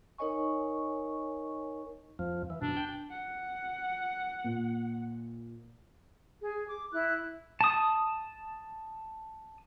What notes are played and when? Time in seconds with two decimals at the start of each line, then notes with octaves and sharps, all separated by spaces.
0.18 D#4 A#4 C#5 D#5 G#5 C#6
2.19 F2 F3
2.50 E3
2.62 F#2 B2 D4
2.77 G5
3.10 F#5
4.44 A#2
6.43 G#4
6.67 D6
6.93 E4 F#6
7.61 A5 D#6